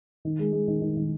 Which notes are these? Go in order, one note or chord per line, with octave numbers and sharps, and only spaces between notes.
D#3
G#3
G#3
D#3
D#3
D#3